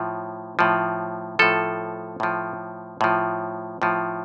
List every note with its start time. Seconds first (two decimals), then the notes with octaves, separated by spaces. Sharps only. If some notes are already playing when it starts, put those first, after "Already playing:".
Already playing: A2 F3
0.59 A2 F3
1.39 A2 F3 A4
2.20 A2 F3
3.01 A2 F3
3.82 A2 F3